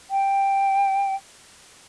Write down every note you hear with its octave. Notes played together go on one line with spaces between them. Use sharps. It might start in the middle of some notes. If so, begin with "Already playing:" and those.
G5